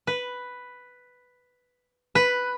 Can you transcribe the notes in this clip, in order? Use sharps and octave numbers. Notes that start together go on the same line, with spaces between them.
B4
B4